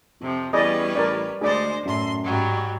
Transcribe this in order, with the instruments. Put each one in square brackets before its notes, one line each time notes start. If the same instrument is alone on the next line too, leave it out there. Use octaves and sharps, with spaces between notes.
[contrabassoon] F2 [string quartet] C3 F3
[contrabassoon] E2 [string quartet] G3 C#4 B4 [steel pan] G#4 D5 D#5
[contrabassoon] A1 [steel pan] A#4 D5
[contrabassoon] D2 [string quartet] G#3 C5 [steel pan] G#4 D5
[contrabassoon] F#2 [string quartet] A2 C6
[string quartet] G#2 F#3 G3